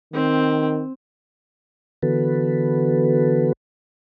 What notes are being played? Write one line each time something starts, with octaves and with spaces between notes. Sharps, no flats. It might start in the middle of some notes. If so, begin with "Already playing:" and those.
D#3 C4
D3 E3 B3 F#4 A4 B4